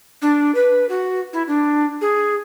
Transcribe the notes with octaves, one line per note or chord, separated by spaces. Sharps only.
D4
B4
F#4
E4
D4
G#4